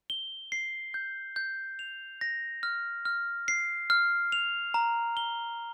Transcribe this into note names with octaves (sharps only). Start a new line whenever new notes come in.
G7
C7
G6
G6
F7
A#6
F6
F6
C7
F6
F7
A#5
G7